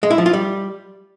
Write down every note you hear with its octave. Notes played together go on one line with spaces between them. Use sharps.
G#3
E4
F3
F4
G3